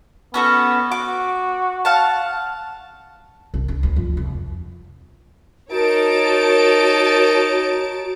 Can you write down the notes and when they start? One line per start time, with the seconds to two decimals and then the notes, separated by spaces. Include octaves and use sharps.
0.34 B3 C#4 F#4 A4
0.92 F#4 D6
1.85 F5 F#5 A5
3.54 C2
3.68 D4
3.83 D2
3.96 F2
4.17 C2
5.71 D#4 F#4 A#4 C#5 A5 D7